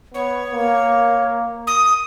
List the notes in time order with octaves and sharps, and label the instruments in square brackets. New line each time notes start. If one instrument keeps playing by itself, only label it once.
[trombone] B3 [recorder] C#5
[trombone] A#3
[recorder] D#6